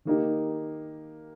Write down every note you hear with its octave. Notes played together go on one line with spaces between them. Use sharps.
D#3 A#3 D#4 G4